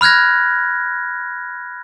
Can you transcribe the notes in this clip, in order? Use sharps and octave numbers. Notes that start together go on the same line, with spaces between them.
B5 F6 F#6 G#6 A#6